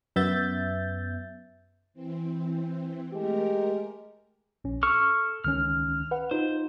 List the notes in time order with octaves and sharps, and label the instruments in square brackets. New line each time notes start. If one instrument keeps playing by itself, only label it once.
[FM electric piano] F#2 B3 E5 G6 A6
[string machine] E3 C4
[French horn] G#3 [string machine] A3 A#4 [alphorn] G4
[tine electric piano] A#1 C#4
[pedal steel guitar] A4 C#6 F6 [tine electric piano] C#7
[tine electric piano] C#2 D#3 C#4 [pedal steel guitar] F6
[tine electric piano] B4 F#5
[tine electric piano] D#4 F4 [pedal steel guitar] C5